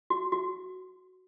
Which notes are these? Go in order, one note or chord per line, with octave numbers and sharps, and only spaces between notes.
F#4
F#4